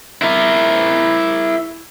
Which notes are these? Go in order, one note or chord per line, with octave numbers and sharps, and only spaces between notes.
E4 A#4